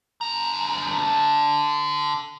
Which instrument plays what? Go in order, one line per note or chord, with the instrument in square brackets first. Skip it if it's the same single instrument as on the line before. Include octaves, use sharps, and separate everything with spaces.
[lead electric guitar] D3 A#5